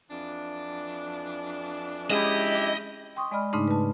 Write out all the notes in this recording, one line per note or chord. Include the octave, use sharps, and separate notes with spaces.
F2 E3 D4
G#3 C#4 E4 G4 G#4 D#5
G5 C6 C#6 D#6
G#3 D5 D#5 B5 F6
G#2 C#3 A3 D4 D#4
B4 A5